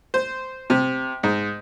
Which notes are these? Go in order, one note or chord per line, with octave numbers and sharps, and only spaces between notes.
C5
C3
G#2